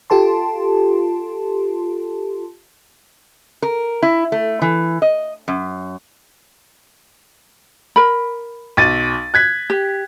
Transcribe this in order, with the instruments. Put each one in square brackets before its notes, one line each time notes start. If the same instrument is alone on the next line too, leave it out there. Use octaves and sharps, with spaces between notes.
[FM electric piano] F4 G4 A4 A5 C6
[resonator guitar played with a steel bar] A#4
E4
A3
E3
D#5
F#2
[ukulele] A#4 B5
[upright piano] B1 A6 D#7
F#6 G#6 B6
[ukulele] G4